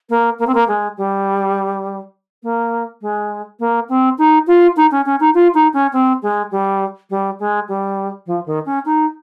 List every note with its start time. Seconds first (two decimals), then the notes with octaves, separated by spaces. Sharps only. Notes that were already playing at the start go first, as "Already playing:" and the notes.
0.09 A#3
0.39 A#3
0.46 C4
0.54 A#3
0.67 G#3
0.97 G3
2.43 A#3
3.01 G#3
3.59 A#3
3.89 C4
4.18 D#4
4.47 F4
4.76 D#4
4.91 C#4
5.05 C#4
5.20 D#4
5.34 F4
5.54 D#4
5.73 C#4
5.92 C4
6.22 G#3
6.51 G3
7.10 G3
7.39 G#3
7.68 G3
8.26 F3
8.46 D#3
8.65 C#4
8.85 D#4